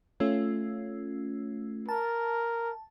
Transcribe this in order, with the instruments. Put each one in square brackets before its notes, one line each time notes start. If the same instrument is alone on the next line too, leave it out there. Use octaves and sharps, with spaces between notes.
[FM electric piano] A3 C#4 F4
[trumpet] A#4 [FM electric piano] A5